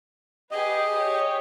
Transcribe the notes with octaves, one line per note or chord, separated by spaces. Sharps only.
G4 G#4 B4 D#5
G4 C#5